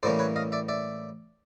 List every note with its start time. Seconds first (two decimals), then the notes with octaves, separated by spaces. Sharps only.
0.03 A2 E3 G3 A#3 C#4 C5 D5
0.19 B4 C#5
0.36 D#5 F5
0.52 D5 E5
0.68 D5 E5